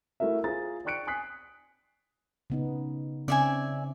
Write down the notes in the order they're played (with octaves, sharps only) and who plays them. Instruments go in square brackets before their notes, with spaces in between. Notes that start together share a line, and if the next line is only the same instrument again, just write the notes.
[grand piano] A3 E4 F#4 A#4 E5
F4 G#4 C5 A#5 A6
D5 G5 C#6 F#6 C#7 D7
G#5 D#6 F#6 B6 C7
[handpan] C#3 B3 D#4
[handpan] C#3 C4 C#4 [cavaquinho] D5 E5 G#5